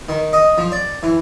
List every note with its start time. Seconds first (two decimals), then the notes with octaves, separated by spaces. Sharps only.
0.09 D#3
0.33 D#5
0.58 F3
0.72 D5
1.03 E3